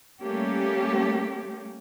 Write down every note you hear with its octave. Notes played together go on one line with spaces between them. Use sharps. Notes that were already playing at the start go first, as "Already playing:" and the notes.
G3 A3 A#3 C#4 G4